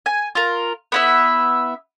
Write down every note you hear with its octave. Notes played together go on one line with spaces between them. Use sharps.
G#5
F4 A#4
B3 E4 E5